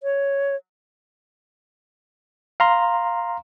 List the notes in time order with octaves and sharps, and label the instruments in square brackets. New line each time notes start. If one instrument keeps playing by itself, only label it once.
[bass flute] C#5
[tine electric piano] F5 A#5 C6